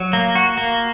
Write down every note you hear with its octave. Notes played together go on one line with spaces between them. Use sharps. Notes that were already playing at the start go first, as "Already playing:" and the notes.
Already playing: F#3
A#3
F#4
A#3